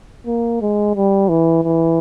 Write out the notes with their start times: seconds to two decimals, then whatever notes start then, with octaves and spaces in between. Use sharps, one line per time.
0.27 A#3
0.61 G#3
0.95 G3
1.29 E3
1.63 E3